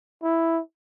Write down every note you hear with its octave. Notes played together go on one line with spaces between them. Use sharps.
E4